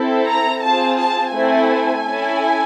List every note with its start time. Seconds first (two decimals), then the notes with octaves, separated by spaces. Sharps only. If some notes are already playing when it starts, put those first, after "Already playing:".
Already playing: C4 E4 A4
0.27 A#5
0.62 C4 F4 G#4 A5
0.99 A5
1.34 A3 C4 E4 A4 G#5
2.05 C#4 E4 A4